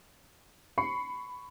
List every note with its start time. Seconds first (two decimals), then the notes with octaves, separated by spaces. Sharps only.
0.78 B5 C#6 C7 C#7